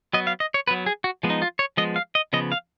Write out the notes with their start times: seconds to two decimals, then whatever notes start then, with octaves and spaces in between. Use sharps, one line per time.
0.13 F#3 B3 D#5
0.27 F5
0.40 D#5
0.54 C#5
0.67 F#3 B3 B4
0.86 G#4
1.04 F#4
1.23 F3 G#3 B3
1.30 D#4
1.42 F4
1.59 C#5
1.77 F3 G#3 B3 D#5
1.96 F5
2.15 D#5
2.33 C#3 F3 B3 D#5
2.52 F5